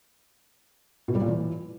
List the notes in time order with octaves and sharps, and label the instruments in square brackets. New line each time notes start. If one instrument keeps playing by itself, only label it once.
[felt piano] B2
G3
A#2
E3